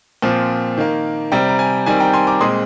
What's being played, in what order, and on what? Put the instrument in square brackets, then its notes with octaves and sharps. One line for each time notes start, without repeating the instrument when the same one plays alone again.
[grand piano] A#2 F3 C4
D#3 A#3
C3 G3 C4 G5 A#5
A#5
G#5
D#3 G3 C4 G#5
G5 A#5
G#5 C6
A#5 D6
A#2 G#3 C4 C6 D#6